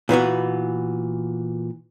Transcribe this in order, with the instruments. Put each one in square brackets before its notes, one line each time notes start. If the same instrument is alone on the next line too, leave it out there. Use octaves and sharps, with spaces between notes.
[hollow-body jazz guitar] A#2 E3 B3 F#4